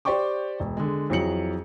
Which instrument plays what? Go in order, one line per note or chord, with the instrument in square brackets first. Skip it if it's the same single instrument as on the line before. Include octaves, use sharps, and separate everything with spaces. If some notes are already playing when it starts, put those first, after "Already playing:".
[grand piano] G4 C5 D5 G5 C#6 D6
E1
D3 G#3
F2 E3 F#3 G#4 C#7 F#7